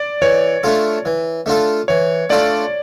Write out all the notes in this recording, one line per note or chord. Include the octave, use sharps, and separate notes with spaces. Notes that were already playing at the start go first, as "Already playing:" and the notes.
Already playing: D5
E3 C#5
A3 D4 F4 A4
E3
A3 D4 F4 A4
E3 C#5
A3 D4 F4 A4 D5